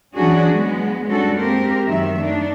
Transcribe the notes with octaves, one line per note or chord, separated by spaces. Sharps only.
E3 F#3 C#4 D4 F#4 G#4
F#3 G#3 B3
G3 C#4 D4 F#4 A4
G#3 A#3 C4 G4 A#4 C5
F#2 D#3 F#3 E5
A3 D4 D#4